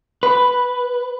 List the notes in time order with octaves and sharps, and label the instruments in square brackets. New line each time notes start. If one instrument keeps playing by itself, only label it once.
[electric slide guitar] B4